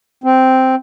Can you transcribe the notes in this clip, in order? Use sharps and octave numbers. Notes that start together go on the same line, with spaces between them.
C4